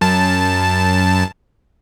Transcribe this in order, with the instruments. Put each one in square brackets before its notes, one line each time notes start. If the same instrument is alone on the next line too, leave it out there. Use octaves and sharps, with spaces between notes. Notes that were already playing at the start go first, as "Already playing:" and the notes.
[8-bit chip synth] F#2 A5